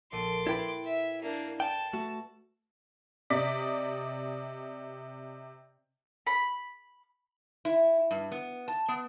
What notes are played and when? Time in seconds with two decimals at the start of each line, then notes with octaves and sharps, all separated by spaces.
0.12 A#1 A4 C6 D6 D#7
0.47 E4 B4 D5 G5 B5
0.84 E5
1.22 A#3 D4
1.60 G5 A5
1.93 A3 F#4
3.30 C3 D5 D#5 B6
6.27 B5
7.65 E4
8.11 G2
8.32 B3
8.68 A5
8.88 B3